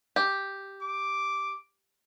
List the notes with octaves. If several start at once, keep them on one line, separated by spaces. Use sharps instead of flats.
G4
D6